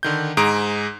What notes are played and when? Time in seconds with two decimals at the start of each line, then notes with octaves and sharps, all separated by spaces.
0.03 D3 D#3 G6
0.37 G#2 G#4 A#5 D#6 D7